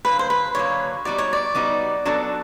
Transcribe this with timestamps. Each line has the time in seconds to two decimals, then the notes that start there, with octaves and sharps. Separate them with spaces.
0.05 D3 F#3 A#3 B4
0.19 C5
0.30 B4
0.55 D3 F#3 A#3 C#5
1.05 G3 B3 D#4 F#4 D5
1.18 C#5
1.33 D5
1.55 G3 B3 D#4 F#4
2.05 F#3 B3 D4 F#4 A4